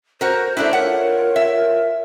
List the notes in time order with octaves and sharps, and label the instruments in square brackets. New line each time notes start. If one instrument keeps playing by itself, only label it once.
[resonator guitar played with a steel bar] F#4 A#4 [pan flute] C5
[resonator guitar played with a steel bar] A3 D4 E4 [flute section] C5 F#6 [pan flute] E5
[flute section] F4 C#5 [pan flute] A#4 [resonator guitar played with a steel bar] F#5
[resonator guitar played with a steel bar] E5